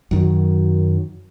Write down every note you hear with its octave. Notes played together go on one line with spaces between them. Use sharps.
F#2 D#3 F#3